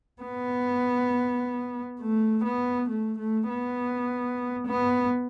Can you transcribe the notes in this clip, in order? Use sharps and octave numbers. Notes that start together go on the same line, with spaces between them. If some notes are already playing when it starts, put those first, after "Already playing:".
B3
A3
B3
A3
A3
B3
B3